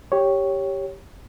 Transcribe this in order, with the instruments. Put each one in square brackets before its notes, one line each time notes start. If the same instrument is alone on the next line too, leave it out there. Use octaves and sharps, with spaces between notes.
[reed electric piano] G4 C#5